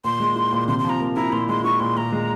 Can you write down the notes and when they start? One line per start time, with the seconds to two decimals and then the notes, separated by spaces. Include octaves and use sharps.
0.04 A#2 C6
0.20 G#3
0.36 E4
0.52 A#2
0.68 C3 C6
0.79 C6
0.84 F3
0.89 A#5
1.00 A#3
1.16 E4 A#5
1.33 A#2 C6
1.48 G#3 C6
1.64 E4 C#6
1.80 A#2 C6
1.96 A#2 A#5
2.12 G#3